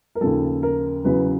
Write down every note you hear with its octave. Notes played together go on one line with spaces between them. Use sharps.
A#4
D#2 C#3 F3 A4
A#4
E2 C#3 F#3 B4